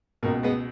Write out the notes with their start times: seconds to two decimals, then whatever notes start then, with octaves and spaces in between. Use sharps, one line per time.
0.23 C#2 B2 A#3
0.43 G#3 B3